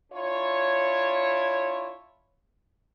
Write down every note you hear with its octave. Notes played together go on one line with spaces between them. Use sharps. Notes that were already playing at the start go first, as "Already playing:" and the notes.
D4 E4 F4 C#5